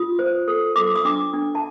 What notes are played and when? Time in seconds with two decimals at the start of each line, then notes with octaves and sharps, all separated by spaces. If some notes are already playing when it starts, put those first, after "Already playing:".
Already playing: F4 D#6
0.19 C5
0.48 A4
0.76 A4 D6
0.95 D#6
1.05 D4 D6
1.33 D4
1.55 A5